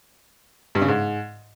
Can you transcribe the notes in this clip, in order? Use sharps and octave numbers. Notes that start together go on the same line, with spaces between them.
G2
C#3
G#2